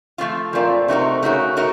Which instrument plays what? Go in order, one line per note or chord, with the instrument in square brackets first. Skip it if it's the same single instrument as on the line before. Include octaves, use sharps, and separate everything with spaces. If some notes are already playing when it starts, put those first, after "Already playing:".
[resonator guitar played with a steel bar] F3 A3 C4 F4
[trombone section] A#2 [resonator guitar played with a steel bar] F3 A3 C4 F4
[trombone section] C3 [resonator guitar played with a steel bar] A3 D#4 F#4 A#4
[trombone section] C#3 [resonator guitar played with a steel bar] A3 D#4 F#4 A#4
[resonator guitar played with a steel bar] A3 D#4 F#4 A#4